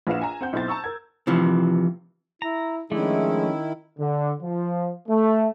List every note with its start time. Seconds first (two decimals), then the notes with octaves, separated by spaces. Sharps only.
0.07 A#1 E4 B4 F5 F#5 E7
0.22 G#5 A#5
0.41 C4 F#5 G6
0.53 B1 C4 E4 C5 A6
0.68 A5 A#5 C#6 E6
0.84 A#4 G#6
1.27 C3 E3 F3
2.42 E4 A#5
2.91 D#3 F3 G#3 A3 C#4 D4 E4
3.99 D3
4.42 F3
5.08 A3